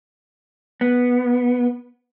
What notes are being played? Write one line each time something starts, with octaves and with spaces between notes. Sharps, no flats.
B3